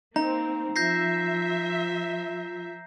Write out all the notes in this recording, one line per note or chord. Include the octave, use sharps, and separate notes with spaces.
A#3 C4 D#4 A#5
F3 F4 E5 G6 A#6 C7